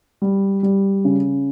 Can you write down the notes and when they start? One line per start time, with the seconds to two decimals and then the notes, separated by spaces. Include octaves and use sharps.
0.22 G3
0.63 G3
1.05 C#3